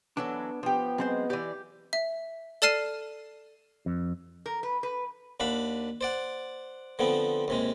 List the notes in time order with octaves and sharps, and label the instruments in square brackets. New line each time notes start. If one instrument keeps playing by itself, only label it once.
[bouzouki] E3 F#3 A4 [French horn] B3 [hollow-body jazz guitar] D4
[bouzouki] F3 G4 [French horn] B3
[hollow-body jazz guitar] F#2 C4 C5 [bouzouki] G#3
[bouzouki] E3 D5 [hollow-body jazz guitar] G4
[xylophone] E5
A4 D5 A5 F6 C7 D#7
[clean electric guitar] F2
[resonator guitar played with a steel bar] A#4
B4
B4
[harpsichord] D#2 D4 F5 F#5 B5
C5 D5 F#5
D3 F3 B3 C4
D#2 C3 G#3